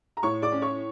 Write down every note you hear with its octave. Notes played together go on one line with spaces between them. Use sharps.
A#5
A2 C#5 C#6
D5 D6
C#4
C#5 C#6